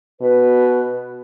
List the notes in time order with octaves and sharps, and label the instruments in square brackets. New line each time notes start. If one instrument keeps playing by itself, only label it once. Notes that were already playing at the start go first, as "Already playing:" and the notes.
[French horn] B2 [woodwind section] B4